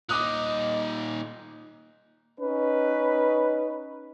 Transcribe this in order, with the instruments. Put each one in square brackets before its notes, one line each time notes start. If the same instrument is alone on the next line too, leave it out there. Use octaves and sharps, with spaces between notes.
[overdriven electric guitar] A#2 D#4 [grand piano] D6 D#6 F#6
[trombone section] C#4 D#4 B4